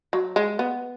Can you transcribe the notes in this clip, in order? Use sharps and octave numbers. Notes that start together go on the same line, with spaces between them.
F#3
G#3
B3